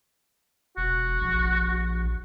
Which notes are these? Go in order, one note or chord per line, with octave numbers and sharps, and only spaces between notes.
E1 F#4
A#1